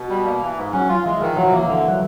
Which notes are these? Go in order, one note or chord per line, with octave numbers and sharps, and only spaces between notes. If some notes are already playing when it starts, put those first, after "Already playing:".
Already playing: B2
G3
A#3
E3
G#2
F#3 C#4
F4
E3 G#3
D#3 F3
E3 F#3
F3
E3 A#3
D3 E3
F#3